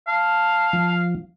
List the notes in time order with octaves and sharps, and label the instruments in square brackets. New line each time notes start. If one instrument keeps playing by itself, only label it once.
[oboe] F5 [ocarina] A5
[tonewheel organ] F3